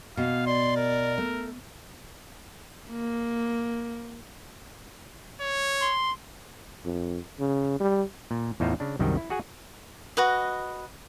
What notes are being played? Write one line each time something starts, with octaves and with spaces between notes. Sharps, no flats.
B2 F5
D5 C6
A#4
A3
A#3
C#5
C6
F2
C#3
G3
A#2
E2 A2 D#4 F4 C5 F5
C#3 D4
C2 F#2 D#3 G3 G5
E4
F#4 G#4 F#5 G#5
F#4 B4 D#5